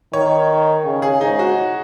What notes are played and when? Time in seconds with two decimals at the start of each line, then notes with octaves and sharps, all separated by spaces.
0.13 D#3 C#5
0.85 C#3
1.02 G#4
1.21 G#2 D#4
1.39 F#4